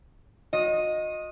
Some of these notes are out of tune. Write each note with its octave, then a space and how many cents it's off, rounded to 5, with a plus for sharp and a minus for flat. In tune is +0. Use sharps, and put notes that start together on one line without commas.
F#4 -45 D#5 +0